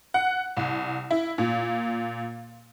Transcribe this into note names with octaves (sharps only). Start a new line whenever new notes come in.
F#5
C2
E4
A#2